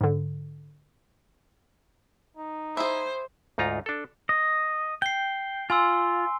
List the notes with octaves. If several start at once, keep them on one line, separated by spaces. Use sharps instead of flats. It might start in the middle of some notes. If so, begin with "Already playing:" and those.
G#2 D3
D#4
E4 G#4 C5
D2 G#2 D#4 F4 A#5
D4 A4
D#5
G5 C7 G7
F4 G#5 C6 E6